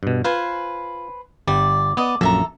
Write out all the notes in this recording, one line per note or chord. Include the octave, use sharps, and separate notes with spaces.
G2 B2
F4 B4 C5 G#5
G1 G3 D5
B3 D5 D#5
A#1 F#2 A4 E5 A#5